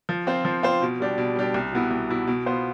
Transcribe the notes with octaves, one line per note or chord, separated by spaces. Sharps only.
F3
C4 F4 C5
F3
C4 F4 C5
B2
G3 D4 G4
B2
G3 D4 G4
C2
B2 B3 E4
C2
B2 B3 E4
B2
B3 F4 C5